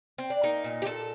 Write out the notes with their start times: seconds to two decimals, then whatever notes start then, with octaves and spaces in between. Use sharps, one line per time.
0.18 C4
0.30 D4
0.43 A#3 D#4
0.64 A#2
0.82 G4
0.86 A#2 A4